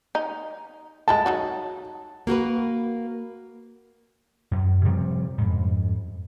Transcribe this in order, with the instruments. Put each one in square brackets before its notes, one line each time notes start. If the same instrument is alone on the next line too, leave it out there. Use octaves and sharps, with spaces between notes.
[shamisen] D#4
[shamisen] G#3 E4 A4 [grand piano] A5
[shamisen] F#3 D#4 F#4
[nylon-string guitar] A#3 F#4 A#4 B4
[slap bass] F#2
C3 F3 G3 C4
F2 G#2